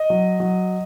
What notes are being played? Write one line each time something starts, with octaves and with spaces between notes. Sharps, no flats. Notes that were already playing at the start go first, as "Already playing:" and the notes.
Already playing: D#5
F#3
F#3